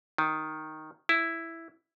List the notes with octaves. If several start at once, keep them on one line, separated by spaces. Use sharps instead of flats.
D#3
E4